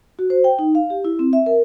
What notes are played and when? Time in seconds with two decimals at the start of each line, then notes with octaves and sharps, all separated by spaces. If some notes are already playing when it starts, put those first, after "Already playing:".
0.19 F#4
0.30 C5
0.44 G5
0.59 D#4
0.75 F5
0.90 G4
1.05 E4
1.19 C4
1.33 E5
1.46 A#4